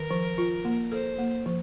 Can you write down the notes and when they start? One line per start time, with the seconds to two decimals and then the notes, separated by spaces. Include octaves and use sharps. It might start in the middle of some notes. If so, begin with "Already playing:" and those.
Already playing: D#3 A#4
0.11 F3
0.38 F4
0.65 A#3
0.92 A4 C5
1.19 A#3
1.46 F3